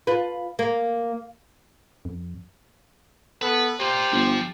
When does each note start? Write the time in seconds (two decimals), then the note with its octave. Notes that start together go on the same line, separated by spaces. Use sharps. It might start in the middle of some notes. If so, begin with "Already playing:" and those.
0.07 F4 B4
0.59 A#3
2.05 F2
3.42 B3 A4 B4
3.80 A#3 F4 G4 C5
4.12 G1 F3